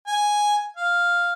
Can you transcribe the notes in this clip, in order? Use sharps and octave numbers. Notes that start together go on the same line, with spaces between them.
G#5
F5